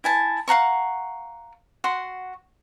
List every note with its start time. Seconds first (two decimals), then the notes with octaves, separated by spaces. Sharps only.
0.04 E4 G#5 A5
0.48 F5 F#5 A#5 C#6
1.84 F#4 F#5 C6